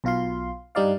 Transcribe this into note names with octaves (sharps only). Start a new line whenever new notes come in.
B1 B2 F4 F5 C6
G2 G3 D#4 D5 F5